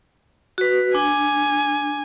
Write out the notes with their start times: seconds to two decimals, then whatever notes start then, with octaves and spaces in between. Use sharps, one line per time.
0.58 F#4 B4
0.95 D4 G#5